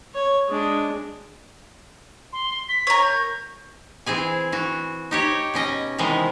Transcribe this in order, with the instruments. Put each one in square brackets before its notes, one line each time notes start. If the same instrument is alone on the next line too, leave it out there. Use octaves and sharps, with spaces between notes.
[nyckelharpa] C#5
G#3 D4
[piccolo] C6
B6
[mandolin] A#4 C#5
[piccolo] G6
[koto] E3 C4 G#4 G#5
E3 F#4
D#4 G4 C#5
B2 C#4 D#5
C3 D#3 E3 G#3 B3